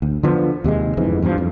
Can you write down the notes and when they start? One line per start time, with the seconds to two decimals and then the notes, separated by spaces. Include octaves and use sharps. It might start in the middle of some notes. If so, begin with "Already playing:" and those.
0.02 D2
0.23 D3 F3 B3
0.64 D#2 C3 G3 G#3
0.97 G1 F2 G#2 E3
1.22 E2 G2 A#2 F3
1.38 F2